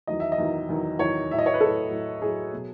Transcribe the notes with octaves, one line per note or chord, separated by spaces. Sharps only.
E2 D#3 F#3 D#5
E5
D#5
E2 D#3 F#3
E2 D#3 F#3
E2 D#3 F#3 C#5
A2 F#3 E5
D#5
C#5
B4
A2 F#3 A4
A2 F#3
A2 F#3 G#4
B2 F#3